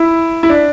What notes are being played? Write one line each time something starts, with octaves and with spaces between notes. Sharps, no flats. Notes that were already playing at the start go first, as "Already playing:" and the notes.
Already playing: E4
E4
D4